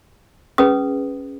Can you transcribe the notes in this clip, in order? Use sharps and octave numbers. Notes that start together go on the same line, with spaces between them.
C#4 G#4 B4 D#6